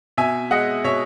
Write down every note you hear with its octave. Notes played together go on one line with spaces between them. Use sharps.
B2 E5 G#5
G#3 D#5 F#5
B2 C#5 E5